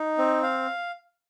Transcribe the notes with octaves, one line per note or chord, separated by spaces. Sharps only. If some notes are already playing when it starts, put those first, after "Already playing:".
Already playing: D#4
C4
F5